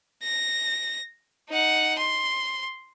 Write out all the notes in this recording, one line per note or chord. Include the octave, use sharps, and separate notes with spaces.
A#6
D#4 F#5
C6